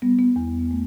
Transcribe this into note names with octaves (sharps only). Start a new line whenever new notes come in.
G3 B3
B3
E2
A3